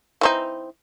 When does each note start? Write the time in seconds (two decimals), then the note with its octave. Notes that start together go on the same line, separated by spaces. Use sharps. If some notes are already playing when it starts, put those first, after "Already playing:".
0.21 E3 C4 D#4